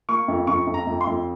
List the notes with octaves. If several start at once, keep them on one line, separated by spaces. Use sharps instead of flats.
A#3 C#6
F2
F2 C#6
F2
A#5
F2
C6
F2